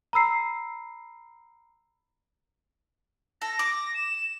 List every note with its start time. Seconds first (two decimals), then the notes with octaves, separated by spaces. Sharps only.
0.13 A#5 B5 E6 C7
3.42 A4 A#6
3.59 D6
3.95 E7